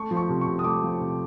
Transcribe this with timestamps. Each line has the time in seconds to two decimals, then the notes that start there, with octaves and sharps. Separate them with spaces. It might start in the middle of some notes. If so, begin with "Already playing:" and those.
Already playing: A3 C#6
0.11 F3
0.17 C#6
0.29 C3
0.41 C3 C#6
0.59 D#6
0.64 A3 D6
0.83 F3
1.00 C3